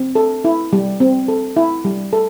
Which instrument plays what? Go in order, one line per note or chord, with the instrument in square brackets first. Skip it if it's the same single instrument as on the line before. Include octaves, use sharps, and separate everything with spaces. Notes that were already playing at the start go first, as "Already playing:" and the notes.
Already playing: [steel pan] C4
A4
E4
G3
C4
A4
E4
G3
A4